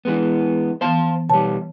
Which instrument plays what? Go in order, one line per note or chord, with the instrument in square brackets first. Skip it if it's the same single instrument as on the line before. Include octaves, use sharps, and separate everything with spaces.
[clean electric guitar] E3 G#3 B3
[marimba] E3 B3 [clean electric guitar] C5 F5 A5
[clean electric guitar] B2 G3 [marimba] C#5 A5